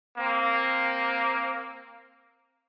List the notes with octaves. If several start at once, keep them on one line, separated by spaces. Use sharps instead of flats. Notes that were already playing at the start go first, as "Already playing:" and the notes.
A#3 C4